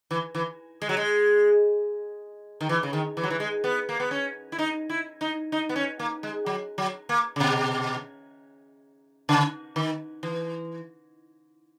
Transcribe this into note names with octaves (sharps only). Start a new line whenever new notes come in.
E3
E3
G#3
F#3
G#3
D#3
E3
C#3
D#3
E3
F#3
E3
G#3
B3
A#3
B3
C#4
E4
D#4
E4
D#4
D#4
B3
C#4
A#3
G#3
F#3
F#3
A#3
C#3
B2
C#3
D#3
E3